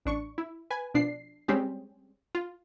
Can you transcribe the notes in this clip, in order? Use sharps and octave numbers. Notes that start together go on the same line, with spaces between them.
A1 D4 C#6
E4
B4 G#5
B2 F3 D4 C7
G3 G#3 C4 C#4 G4 G#4
F4